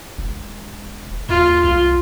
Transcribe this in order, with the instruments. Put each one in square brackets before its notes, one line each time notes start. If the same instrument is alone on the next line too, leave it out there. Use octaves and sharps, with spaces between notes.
[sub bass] E1
[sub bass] D#2 [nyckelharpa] F4
[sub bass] C2 [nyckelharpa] F4